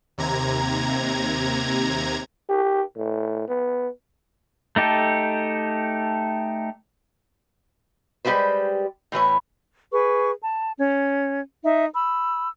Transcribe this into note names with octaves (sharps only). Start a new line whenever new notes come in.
D#2 C3 A#5 G#6
G4
A2
B3
A3 D#4 G4 A4
G3 G#3 F4 G4 B4 C5
A2 E3 B4 C#5
G#4 B4 C#6
A5
C#4 G#6
D#4 E5
B5 E6